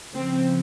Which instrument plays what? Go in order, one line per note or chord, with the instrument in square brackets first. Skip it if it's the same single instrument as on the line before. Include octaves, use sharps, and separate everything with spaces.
[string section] C#3 F3 C4